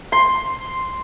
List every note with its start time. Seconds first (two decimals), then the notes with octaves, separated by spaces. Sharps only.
0.12 C6